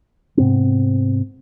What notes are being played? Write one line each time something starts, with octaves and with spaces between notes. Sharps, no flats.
G#2 C3 B3 C4